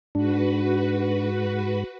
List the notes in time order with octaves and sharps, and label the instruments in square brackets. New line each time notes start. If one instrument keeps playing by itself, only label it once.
[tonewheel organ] G#2 [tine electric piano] D4 [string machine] F#4 B4